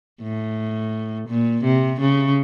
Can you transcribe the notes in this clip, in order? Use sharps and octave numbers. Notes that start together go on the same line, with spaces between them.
A2
A#2
C3
C#3